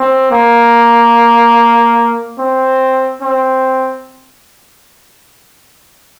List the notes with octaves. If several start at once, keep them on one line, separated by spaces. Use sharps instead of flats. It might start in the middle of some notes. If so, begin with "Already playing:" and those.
Already playing: C4
A#3
C4
C4